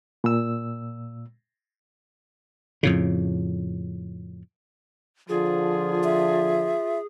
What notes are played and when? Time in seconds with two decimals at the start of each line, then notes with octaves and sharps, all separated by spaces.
0.24 A#2 E6
2.83 F2 A2 C#3
5.29 D3 F3 F4 G#4
6.04 E5